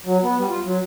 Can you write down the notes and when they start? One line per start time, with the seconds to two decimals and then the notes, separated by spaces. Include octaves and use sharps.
0.06 F#3
0.23 B3
0.38 G3
0.49 F4
0.65 F#3